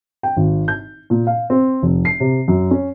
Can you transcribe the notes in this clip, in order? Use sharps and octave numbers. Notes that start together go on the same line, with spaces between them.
G5
G#1
G6
A#2
F5
C4
F1
C7
C3
F#2
C#4